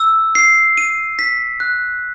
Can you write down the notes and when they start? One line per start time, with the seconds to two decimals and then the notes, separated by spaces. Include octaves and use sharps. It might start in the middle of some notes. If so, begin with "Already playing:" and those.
Already playing: E6
0.35 C7
0.77 D#7
1.19 B6
1.60 F#6